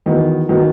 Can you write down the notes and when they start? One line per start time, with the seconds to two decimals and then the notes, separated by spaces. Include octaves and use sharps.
0.06 E2 D#3 F#3 B3
0.49 D#3 F#3 B3